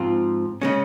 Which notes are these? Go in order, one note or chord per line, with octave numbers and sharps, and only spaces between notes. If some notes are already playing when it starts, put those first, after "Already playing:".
Already playing: G#2 F3 C4 F4
C#3 G#3 C#4